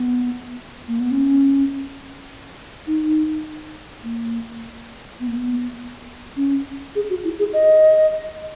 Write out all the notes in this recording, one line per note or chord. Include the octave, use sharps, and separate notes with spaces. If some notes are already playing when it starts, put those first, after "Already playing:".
Already playing: B3
A#3
B3
C#4
D#4
A#3
B3
A#3
B3
C#4
G#4
F#4
E4
G#4
D#5